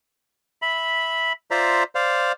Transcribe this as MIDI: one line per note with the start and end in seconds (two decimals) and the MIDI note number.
0.62 1.33 76
0.62 1.33 83
1.51 1.83 65
1.51 1.83 72
1.51 1.83 74
1.51 1.83 76
1.51 1.83 82
1.95 2.32 72
1.95 2.32 74
1.95 2.32 77